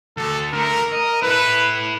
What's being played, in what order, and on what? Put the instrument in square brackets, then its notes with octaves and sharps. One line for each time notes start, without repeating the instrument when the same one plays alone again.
[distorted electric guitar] D2 [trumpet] A4
[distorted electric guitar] D3 A3 [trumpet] A#4
[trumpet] A#4 [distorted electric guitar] D#5
[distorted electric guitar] E4 A4 [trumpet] B4